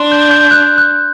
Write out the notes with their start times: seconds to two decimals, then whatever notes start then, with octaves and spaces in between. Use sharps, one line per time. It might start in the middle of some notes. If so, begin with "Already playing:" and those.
Already playing: D4 C6
0.12 G6
0.31 G6
0.51 F#6
0.78 F#6